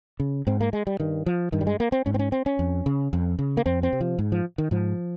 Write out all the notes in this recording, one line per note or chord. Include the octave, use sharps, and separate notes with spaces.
C#3
G#2 C4
A#3
G#3
G3
G2 D#3
F3
G2 D#3
G3
G#3
A#3
C4
G#2 C#4
C4
C#4
C4
C#4
F2
C#3
F2
C#3
A#3
F2 C4
C4
C3
F3
G#2
F3
D#3
G#2 F3